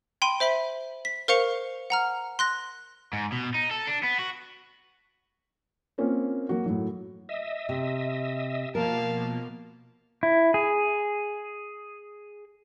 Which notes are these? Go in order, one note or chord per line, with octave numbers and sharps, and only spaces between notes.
G5 B5 C6 D#7
C5 E5 B5 B6
B6
A#4 C5 F5 C#6 C#7 F7
F#5 A#5 F6
C6 F#6 A#6
G#2
B2
D#4
A4
D4
B3
F#4
A#3 C4 C#4 F4
F#3 A#3 F#4
A2 F#3
D#5 E5
C3
B2 F3 A#3 A#4 F5 A5
E4
G#4